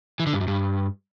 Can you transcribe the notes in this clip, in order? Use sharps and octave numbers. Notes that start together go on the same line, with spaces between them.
E3
D3
G2
F#2
G2